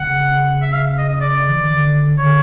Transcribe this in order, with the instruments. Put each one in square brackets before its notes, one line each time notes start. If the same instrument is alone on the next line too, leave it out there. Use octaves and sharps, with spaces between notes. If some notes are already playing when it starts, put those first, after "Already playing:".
Already playing: [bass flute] C#3 [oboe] F#5
[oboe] E5
F5
D#5
D#5
D5
[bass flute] E3
D#3
D3
[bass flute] D3 [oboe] C#5